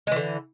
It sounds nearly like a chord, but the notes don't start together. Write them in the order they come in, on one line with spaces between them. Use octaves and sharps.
G#3 E3 D3